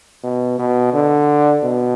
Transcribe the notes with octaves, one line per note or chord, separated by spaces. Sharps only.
B2
B2
D3
B2